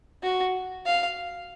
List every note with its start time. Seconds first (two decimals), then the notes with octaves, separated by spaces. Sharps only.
0.23 F#4
0.86 F5